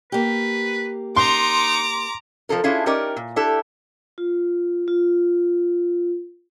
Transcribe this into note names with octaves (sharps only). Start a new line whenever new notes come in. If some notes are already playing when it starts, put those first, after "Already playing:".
A#3 G4 B4
D#4 A#5 C6 D6
F2 F3 D#4 A4 A#4
C#4 D4 E4 F4 G#4
C#4 D#4 G4 A#4 D5
A#2
D4 E4 G4 A4
F4
F4